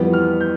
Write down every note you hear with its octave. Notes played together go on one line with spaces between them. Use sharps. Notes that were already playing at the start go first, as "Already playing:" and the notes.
Already playing: F2 E3 G3 B3
F6
G6